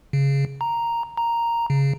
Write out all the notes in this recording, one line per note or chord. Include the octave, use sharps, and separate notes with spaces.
C#3
A#5
A#5
C#3